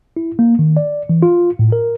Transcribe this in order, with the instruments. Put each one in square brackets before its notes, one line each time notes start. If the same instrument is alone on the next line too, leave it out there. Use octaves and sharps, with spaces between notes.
[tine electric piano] E4
A#3
D#3
D5
E3
F4
A2
A#4